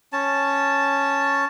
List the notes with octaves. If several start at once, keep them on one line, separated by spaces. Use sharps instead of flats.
C#4 A5